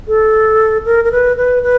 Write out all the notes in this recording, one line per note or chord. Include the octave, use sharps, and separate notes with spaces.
A4
A#4
A#4
B4
B4
B4